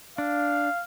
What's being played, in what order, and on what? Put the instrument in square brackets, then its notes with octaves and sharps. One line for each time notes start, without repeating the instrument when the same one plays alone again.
[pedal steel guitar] D4 [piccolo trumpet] F5